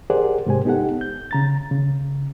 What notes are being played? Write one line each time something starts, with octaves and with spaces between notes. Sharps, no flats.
G4 G#4 A#4 C5 D5 F#5
G#2 C3 G#3 G4 C5 G#5
B3 D#4 G4 A4 F#5
G6
C#3 A#5 A6
C#3